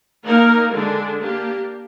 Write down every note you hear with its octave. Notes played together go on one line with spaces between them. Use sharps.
A#3 D#4 A#4
D3 G#3 D4
A#3 D4 G4